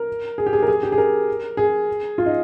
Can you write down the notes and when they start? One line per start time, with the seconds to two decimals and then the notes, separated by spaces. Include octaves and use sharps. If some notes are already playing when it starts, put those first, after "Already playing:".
Already playing: A#4
0.38 G#4
0.46 G4
0.53 G#4
0.63 A#4
0.68 G#4
0.83 G4
0.92 G#4
0.98 A#4
1.57 G#4
2.18 F4
2.26 D#4